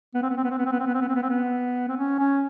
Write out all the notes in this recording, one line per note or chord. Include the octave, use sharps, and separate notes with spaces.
B3
C4
B3
C4
B3
C4
B3
C4
B3
C4
B3
C4
B3
C4
B3
C4
B3
C4
C#4
C#4